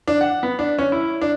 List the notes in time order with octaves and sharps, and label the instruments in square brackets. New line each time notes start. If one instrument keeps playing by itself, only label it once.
[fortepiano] D4
F#5
B3
D4
C#4
E4
D4